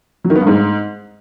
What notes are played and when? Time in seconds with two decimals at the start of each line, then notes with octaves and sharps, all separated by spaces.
0.24 F#3
0.30 D#3
0.36 B3
0.41 G2
0.47 G#2